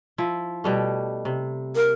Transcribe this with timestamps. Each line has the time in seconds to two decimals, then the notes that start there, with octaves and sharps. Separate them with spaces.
0.18 F3 E4
0.64 B2 G3 A3
1.25 C3
1.76 A#4